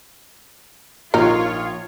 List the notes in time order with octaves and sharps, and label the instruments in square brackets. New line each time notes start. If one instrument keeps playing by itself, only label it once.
[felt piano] A#1 [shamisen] D#4 A#4 [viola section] F4 C#5